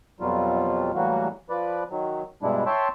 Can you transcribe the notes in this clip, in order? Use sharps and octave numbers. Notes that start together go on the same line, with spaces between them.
F2 B2 F#3 G3 F4
A2 E3 F#3 G3 A#3 F#4
F3 B4 D5
D#3 F#3
G2 B2 G3 G#3 D4 E4
C#5 E5 G5 A5 C6